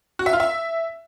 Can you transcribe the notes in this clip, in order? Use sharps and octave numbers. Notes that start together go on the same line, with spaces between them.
F#4
E5
F4
E5